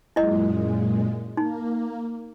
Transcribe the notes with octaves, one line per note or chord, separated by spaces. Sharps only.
F#2 A#2 G#3 E4 D#5
A#3 D#4